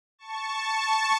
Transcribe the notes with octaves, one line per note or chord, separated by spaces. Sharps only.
A5 C#6
A5 C#6